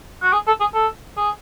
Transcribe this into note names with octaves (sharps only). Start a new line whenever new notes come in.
F#4
G#4
A4
G#4
A4
G#4